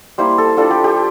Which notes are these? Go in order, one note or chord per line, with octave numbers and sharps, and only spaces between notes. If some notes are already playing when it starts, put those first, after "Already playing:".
G3 A#3 E4 C5
A4
G3 D4 F4 A4
G4
G4